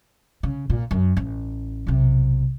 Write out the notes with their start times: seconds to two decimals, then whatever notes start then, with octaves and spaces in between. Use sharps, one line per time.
0.43 C#3
0.70 A#2
0.91 F#2
1.17 A1
1.87 B1 C3